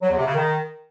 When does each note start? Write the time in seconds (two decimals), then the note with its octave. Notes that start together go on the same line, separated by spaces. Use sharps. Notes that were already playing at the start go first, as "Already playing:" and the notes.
0.01 F#3
0.10 E2
0.18 C3
0.26 C#3
0.35 D#3